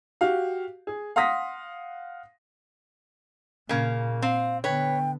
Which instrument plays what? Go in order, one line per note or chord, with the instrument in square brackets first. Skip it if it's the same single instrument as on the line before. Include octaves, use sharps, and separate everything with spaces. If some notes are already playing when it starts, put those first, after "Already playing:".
[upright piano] F#4 G4 F5
G#4
F5 F#5 C6 D#6 A#6 B6
[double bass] A#2 [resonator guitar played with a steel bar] C#3 A#3
[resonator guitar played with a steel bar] C4 [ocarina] F5
[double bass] D3 B3 [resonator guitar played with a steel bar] B4 C#5 [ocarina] G5